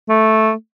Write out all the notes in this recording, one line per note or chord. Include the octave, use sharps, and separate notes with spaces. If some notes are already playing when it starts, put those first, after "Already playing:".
A3